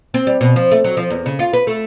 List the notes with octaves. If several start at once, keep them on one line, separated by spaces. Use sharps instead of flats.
C4
G3
B2
F3
A3
F#3
F3
E2
C#3
F4
B4
A3